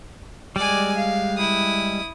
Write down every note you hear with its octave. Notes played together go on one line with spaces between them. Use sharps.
G3 G#3 D5 G#5
F5
E4 D#6